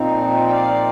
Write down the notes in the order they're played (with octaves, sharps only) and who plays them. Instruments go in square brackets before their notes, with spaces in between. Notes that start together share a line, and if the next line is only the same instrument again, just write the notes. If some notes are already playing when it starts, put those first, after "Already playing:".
Already playing: [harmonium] A#2 F3 C4 D#4
G5
D5 F5